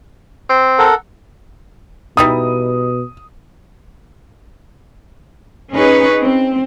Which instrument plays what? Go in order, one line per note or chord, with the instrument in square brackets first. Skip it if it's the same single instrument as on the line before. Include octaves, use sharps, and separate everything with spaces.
[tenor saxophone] C4
[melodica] A4 A#4 F#5
[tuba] B2 [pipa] G3 D#4 E4 [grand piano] D#6
[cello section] C#4 D#4 G#4 B4 C#5
C4